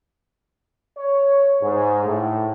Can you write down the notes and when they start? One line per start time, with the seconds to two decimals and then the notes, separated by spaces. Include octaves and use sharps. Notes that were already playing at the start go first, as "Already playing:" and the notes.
0.97 C#5
1.62 G#2
2.05 A2